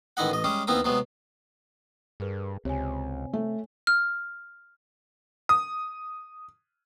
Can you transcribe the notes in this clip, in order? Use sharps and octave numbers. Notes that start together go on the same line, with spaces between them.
A1 D#3 E4 D#5 F#5
A1 D#5
G3 G#3 C#4 G#4
D#2 B3 C4 E4 A#4 D#6
C3 F#3 G#3 B3
G2 G#4 A#4 B4
C#2 C3 C#5 G#5
A3
F6
D#6